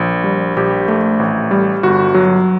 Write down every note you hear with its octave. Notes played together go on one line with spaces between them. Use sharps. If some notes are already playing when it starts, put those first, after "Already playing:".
Already playing: A#1
G3
A#1 G4
A3
A1
G3
G1 F#4
F#3